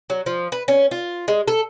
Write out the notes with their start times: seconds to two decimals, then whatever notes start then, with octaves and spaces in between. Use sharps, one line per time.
0.10 F#3
0.26 F3
0.52 B4
0.68 C#4
0.91 F4
1.28 G#3
1.48 A4